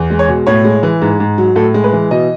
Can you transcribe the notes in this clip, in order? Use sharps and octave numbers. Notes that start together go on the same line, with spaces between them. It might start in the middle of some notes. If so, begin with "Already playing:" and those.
Already playing: E2
G#3
C#5
B2
A2 C#5
G#3
E3
G#2
G#2
F#3
A2 A4
G#3
B4
E3
B2 D#5